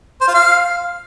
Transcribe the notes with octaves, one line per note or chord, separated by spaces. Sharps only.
C5
F4
F5